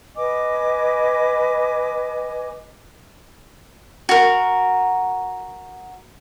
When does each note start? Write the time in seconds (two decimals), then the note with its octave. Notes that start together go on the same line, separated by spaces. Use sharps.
0.16 B4 D#5 G#5 D6
4.09 F#4 A#4